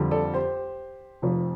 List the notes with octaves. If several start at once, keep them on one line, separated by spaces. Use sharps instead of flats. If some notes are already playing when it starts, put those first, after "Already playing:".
Already playing: F2 D3 G3
A4 D5
G4 C5
F1 F2 F3